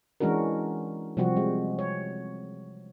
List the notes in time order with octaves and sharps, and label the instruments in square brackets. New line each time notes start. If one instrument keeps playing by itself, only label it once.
[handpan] E3 G#3 C#4 D4 F#4 A#4
C3 F3 G3 C4 F#4
G#3
C#5